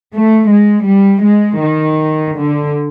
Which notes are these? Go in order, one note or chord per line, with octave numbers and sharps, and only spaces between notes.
A3
G#3
G3
G#3
D#3
D3